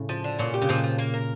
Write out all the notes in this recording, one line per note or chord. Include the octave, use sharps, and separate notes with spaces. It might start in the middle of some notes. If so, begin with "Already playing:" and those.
Already playing: A2 C#3
F3
D3
A#2 C#4
G4
C#3
A#2 F3
F3
A#3
A#4